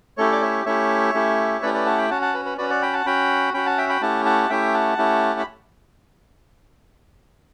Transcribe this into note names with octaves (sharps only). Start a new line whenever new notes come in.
A3 C#4 E4 G4 A4 C#5
D5
C#5 E5
A3 C#4 E4 G4 C#5 E5
A3 C#4 E4 G4
A3 C#4 E4 G4 B4 D5
B4 D5
F#5 A5
G5 B5
C#4 F#4 F#5 A5
F#5 A5
B4
B4
C#4 F#4 B4 D5
D5 F#5
G5 B5
F#5 A5
C#4 F#4 G5 B5
C#4 F#4 G5 B5
F#5 A5
E5 G5
G5 B5
A3 C#4 E4 G4 F#5 A5
F#5 A5
A3 C#4 E4 G4 E5 G5
F#5 A5
A3 C#4 E4 G4
B5